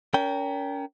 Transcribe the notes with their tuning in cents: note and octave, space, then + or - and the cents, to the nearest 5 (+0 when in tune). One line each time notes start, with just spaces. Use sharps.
C#4 +35 A#4 +0 G5 +0